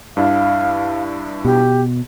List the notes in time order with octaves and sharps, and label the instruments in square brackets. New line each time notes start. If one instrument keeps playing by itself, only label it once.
[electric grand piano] G2 D4 E4 [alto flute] F5
[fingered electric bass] B2 [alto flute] G4